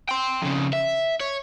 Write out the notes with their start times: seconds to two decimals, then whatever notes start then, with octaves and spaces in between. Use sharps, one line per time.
0.09 G5 C6
0.42 F2 C#3
0.73 E5
1.20 C#5